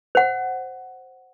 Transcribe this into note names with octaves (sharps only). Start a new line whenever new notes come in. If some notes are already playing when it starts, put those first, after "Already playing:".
C5 F#5